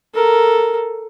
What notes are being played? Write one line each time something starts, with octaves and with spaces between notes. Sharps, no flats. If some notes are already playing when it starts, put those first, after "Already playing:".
A4 A#4